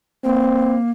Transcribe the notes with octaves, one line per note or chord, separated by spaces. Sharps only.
A#3 C4